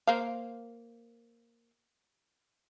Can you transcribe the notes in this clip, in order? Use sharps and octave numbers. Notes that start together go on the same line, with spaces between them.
A#3 C5 F5